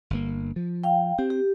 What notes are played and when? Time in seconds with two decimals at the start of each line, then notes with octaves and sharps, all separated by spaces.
0.10 G1 A#3
0.56 F3
0.84 F5 G5
1.19 C4 G4
1.30 G4